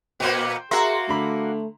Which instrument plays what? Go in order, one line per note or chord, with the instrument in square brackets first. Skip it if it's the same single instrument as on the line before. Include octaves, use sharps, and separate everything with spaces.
[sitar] A#2 A#3 B3 [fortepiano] C5 G5
[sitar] A#3 F#4 [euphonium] G#4 [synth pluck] E5 A#5 C6
[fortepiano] D3 B5 [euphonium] A3